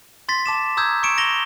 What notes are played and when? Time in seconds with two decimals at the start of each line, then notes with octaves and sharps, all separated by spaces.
0.29 C6 A6 B6
0.46 A5 D6 E7
0.77 A#5 D#6 E6 G6 G#6
1.03 C#6 C#7 D7 E7
1.18 A#6 F7 G7